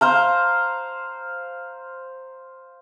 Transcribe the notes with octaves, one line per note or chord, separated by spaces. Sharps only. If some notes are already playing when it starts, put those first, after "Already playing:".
C5 F5 A#5